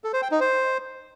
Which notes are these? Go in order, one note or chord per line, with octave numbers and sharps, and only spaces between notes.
A4
C5
G5
D#4
C5